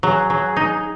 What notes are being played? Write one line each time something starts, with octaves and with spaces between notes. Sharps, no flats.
F#3 G#4
F#3
D#4